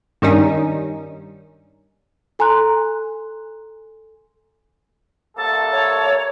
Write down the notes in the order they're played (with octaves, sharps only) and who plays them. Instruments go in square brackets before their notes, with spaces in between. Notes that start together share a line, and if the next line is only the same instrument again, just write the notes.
[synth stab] G2 D#3 G3 C#4 D#4
[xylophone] A4 G#5 A#5 C6 F#6
[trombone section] C2 A#3 A4 [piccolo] A5
[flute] C#5